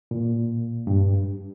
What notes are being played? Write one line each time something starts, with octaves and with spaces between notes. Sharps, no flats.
A#2
G2